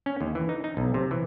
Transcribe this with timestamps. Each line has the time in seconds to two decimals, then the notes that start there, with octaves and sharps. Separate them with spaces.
0.06 C#4
0.21 D#2
0.35 E3
0.49 D#4
0.64 D#4
0.77 B1
0.94 C3
1.11 E3